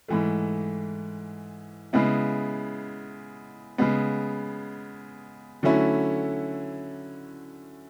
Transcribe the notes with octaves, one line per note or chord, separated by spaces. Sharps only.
G#2 E3 A3
C#3 G#3 B3 E4
C#3 G#3 B3
D3 F#3 A3 C#4 E4